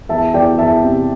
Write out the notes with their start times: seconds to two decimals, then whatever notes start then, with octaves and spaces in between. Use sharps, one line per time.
0.09 E2 E5 A5
0.34 E2 D5 G5
0.58 E2 E5 A5
0.83 C3